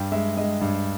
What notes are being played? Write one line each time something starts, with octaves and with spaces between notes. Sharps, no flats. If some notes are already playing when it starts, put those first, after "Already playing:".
Already playing: G2 G5
G#3 E5
G#3 D#5
G2